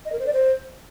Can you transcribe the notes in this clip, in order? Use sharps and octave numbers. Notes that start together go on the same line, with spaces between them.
D#5
A#4
C5
D5
C5